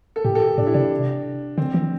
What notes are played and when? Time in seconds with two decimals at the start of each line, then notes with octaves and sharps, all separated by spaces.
0.16 A4
0.24 A2 G4
0.35 A4
0.47 G4
0.58 A2 D4
0.67 E4
0.74 C3 D4
1.58 D3 C4
1.74 E3